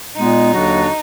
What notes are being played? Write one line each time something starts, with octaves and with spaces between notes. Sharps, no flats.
A#2 G#3 B3 D#4
D#2 D3 F#3 D4 F#4